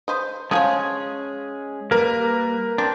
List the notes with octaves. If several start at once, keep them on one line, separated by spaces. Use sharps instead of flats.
B4 C5 D#5
F3 G#3 C#4 F4 G#4 C#5
G3 A#3 A#4 B4
C4 D4